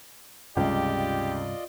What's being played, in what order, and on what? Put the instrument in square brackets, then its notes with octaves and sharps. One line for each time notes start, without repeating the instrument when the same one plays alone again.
[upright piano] C#2 [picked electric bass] G2 C3 G3 [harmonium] F4 D5 D#5 [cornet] G4